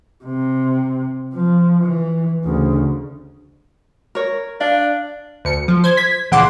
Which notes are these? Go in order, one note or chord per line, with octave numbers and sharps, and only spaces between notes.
C3
F3
E3
D2 C#3
A#4 C#5
D4 F5
D2 C#7
F3
C5 G#6
G#6 B6
C#2 A#2 E3 F#5 C6 D6